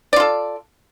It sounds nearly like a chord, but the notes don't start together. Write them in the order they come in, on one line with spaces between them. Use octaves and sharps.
D5 F4 A4